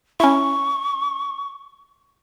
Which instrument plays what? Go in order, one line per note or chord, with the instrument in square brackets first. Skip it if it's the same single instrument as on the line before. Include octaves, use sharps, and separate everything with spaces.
[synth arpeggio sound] C#4 E4 [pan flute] C#6